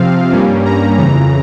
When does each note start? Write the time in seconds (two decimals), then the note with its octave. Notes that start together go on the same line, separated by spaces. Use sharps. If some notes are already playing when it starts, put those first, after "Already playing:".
Already playing: C3 F3 C4 F5
0.32 G2 G3 A#3 C#4
0.65 A#5
0.98 F2 C#3 E3 A#5